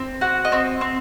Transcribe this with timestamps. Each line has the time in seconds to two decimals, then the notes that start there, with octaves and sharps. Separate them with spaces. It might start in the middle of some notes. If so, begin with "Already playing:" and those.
Already playing: C4
0.21 F#4 F#5
0.45 D#5
0.52 C4
0.81 C4